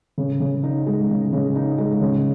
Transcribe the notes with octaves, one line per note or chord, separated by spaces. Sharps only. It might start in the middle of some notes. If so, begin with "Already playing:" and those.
C#3
C#3
D#4
G#3
C#3
C#3
D#4
G#3
C#3